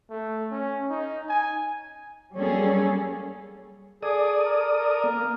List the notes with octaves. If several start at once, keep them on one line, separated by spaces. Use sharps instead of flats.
A3
C#4
D#4
G#5
F#3 G3 A#3 C#4 G#4 A4
G#4 A4 D5 D#6
A#4
A#4
A#3